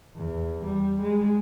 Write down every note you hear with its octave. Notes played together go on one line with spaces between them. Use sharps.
E2
G3
G#3